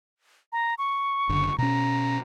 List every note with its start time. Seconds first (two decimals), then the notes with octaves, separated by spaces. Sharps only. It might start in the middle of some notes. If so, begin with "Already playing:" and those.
0.52 A#5
0.78 C#6
1.29 F#1 D3
1.58 B2 C#4 A#5